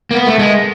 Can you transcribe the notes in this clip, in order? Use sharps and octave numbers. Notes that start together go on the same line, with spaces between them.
A#3
B3
A3
G#3